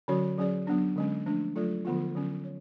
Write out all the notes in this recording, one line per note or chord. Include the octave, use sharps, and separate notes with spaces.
D3 F#3 C#4 F#4 C#5
F#3 C#4 G#4 D5
F#3 B3 D4
D3 G#3 C#4
F3 A3 D4
F#3 A3 F4 A4
D3 F3 B3 F4
D3 F#3 C#4
C#5